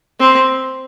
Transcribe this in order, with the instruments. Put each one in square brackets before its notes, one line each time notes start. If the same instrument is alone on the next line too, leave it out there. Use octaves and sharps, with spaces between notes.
[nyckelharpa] C4